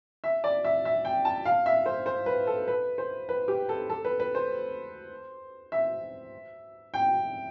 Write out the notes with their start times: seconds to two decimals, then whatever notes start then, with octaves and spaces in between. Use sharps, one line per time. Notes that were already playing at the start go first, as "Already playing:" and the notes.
0.24 E5
0.44 D5
0.65 E5
0.85 E5
1.05 G5
1.25 A5
1.46 F5
1.66 E5
1.86 C5
2.06 C5
2.26 B4
2.47 A4
2.68 B4
2.98 C5
3.29 B4
3.48 G4
3.69 A4
3.90 A4
4.05 B4
4.20 B4
4.35 C5
5.72 E5
6.94 G5